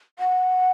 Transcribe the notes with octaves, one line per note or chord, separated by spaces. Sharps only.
F#5